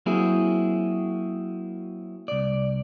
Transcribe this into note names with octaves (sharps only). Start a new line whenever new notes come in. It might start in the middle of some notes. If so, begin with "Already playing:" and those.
F#3 A#3 C4 E4 F#4 G#4
C2 D5